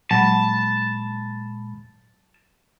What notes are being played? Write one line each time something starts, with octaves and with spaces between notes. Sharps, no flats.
A#2 F#3 G#3 A5 B5